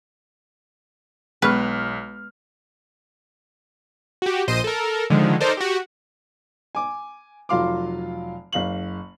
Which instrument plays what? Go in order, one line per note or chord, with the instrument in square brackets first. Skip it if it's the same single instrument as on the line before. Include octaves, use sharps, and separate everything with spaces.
[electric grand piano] B1 F6 [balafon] G#3 B3 C#6 [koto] B4
[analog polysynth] F#4 G4
A#1 C5 D#5 C7 D#7
A4 A#4
D3 D#3 F3 G#3
D#4 A4 A#4 C5 D5
F#4 G4
[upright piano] G#5 D6
F1 F#3 F4 F5 C6 D6
F#1 F5 F#7